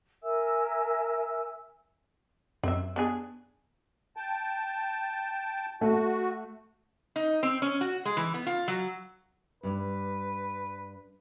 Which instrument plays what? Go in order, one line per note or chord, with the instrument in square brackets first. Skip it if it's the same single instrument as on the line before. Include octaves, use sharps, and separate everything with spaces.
[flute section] A#4 E5 G#5 E6
[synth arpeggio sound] F#2 [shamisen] C4 E5
[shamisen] B3 D4 G#4
[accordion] G5 A5
[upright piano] A3 [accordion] F#4
[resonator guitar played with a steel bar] D#4
C4
C#4
F#4
G#3
E3
B3
F4
F#3
[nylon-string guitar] G2 G3 D4 [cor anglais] B4